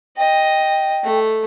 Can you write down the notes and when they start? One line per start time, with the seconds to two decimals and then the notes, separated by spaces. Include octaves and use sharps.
0.17 D#5 G5
1.04 A3